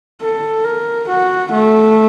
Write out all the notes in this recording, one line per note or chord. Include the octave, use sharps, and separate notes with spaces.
A4
A#4
F#4
A3